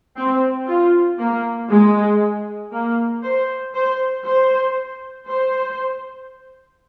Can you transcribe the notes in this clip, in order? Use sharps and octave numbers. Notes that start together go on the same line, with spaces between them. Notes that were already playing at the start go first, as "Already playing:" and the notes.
C4
F4
A#3
G#3
A#3
C5
C5
C5
C5